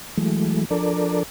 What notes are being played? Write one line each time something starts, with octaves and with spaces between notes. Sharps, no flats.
E3 F#3 G#3 A3
F3 D4 A4 A#4 D5